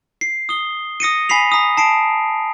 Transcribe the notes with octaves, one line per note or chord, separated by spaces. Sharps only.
C7
D#6 G7
D#6 A#6 C#7 D#7
G#5 B5 B6 C7 F7
A#5 D#6
A5 C7 D7